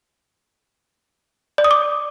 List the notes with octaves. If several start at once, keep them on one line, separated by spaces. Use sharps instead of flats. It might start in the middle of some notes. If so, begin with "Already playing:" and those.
D5
D#6
D6